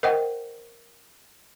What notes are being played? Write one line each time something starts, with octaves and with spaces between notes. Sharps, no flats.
A#4 C5 D#5 F#5 G5